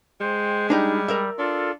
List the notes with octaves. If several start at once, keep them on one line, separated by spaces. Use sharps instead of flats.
G#3 C5 G5
G3 D4 D#4 G4
A#4 D5 E5
D4 F4 A4